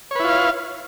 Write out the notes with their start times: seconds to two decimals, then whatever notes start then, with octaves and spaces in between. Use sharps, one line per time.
0.11 C#5
0.15 B4
0.20 E4
0.24 F4
0.29 F5